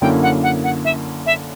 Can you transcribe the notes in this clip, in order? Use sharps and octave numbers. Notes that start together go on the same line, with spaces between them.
F#2 D3 A#3 C#4 E4 G5
F#5
F#5
F#5
E5
E5